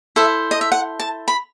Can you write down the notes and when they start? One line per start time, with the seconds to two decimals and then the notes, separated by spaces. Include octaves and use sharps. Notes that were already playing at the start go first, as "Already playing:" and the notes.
0.16 E4 A4 C5 E5
0.51 D#5
0.61 E5
0.72 F#5
1.00 A5
1.28 B5